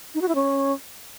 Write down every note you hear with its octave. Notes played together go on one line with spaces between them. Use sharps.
D#4
F#4
E4
C#4